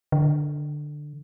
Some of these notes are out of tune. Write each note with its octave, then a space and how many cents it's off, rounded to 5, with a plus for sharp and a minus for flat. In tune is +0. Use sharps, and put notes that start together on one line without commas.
D3 +10